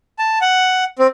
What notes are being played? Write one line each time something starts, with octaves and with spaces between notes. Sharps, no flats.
A5
F#5
C4